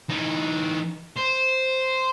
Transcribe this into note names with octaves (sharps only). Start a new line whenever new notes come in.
E3 D#4
C5